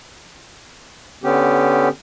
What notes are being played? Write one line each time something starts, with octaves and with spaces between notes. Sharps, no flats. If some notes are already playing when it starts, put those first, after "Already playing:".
D3 B3 C#4 G4